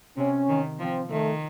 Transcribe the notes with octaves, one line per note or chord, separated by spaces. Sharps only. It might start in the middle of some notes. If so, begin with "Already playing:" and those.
C3 C#4
D#3
F3 C4
D#3 A3